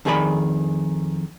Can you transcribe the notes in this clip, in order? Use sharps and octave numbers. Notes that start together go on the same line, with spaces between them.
F2 D#3 G#4 A4 D5 B5